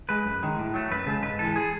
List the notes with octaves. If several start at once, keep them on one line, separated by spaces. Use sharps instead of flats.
G#3 B4
F#2
D#3 G#3
A2
F#3 A3
F#2 B4
C#3 G#3 A4
G#2 B4
E3 G#3 A4
G#4